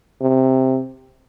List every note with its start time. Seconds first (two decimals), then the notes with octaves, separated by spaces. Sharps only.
0.21 C3